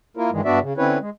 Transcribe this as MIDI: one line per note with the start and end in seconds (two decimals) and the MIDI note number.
0.17 0.30 58
0.17 0.30 64
0.17 0.30 65
0.17 0.30 70
0.31 0.41 43
0.31 0.41 51
0.31 0.41 52
0.31 0.41 56
0.45 0.59 43
0.45 0.59 59
0.45 0.59 62
0.45 0.59 66
0.45 0.59 74
0.45 0.59 76
0.61 0.73 49
0.77 0.98 50
0.77 0.98 60
0.77 0.98 61
0.77 0.98 64
0.77 0.98 71
0.77 0.98 73
1.00 1.10 56